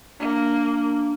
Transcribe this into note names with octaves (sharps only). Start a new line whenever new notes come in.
A#3 D4